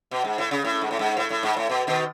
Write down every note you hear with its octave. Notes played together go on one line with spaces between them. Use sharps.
B2
G#2
A2
C#3
A2
G#2
A2
G#2
A2
A2
G#2
A2
B2
B2 D#3